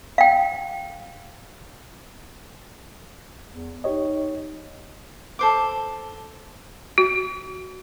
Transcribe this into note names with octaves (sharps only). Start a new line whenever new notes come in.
F5 G5
E2
D#4 G4 C#5 D#5
A4 C5 D6
F#4